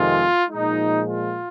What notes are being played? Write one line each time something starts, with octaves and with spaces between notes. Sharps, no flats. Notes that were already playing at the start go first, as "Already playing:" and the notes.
Already playing: F2 C3 D#3 G#3 F4
A#2 F3 G#3 D#4
F4